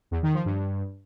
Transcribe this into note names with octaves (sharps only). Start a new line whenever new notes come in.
E2
D#3
F3
G2